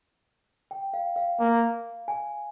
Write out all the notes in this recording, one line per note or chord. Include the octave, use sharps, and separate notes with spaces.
G5
F5
F5
A#3
G#5